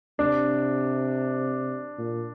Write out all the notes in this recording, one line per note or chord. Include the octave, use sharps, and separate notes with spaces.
C3 D4
A#2